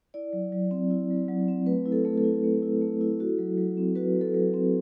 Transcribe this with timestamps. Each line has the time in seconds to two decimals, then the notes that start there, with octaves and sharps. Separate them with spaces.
0.14 E4 D5
0.33 F#3
0.52 F#3
0.71 C4
0.91 E4
1.10 F#3
1.28 F#3
1.48 C4
1.66 A3 B4
1.86 E4
1.92 A4
2.05 A3
2.18 A4
2.24 E4
2.44 A3
2.62 E4
2.81 A3
3.01 E4
3.20 F#4
3.38 F#3
3.58 F#3
3.77 C4
3.95 F#4 B4
4.16 F#3
4.21 A4
4.34 F#3
4.54 C4